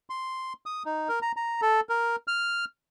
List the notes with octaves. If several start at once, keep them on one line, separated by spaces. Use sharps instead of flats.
C6
D#6
D#4
A#4
A#5
A#5
A4
A#4
F6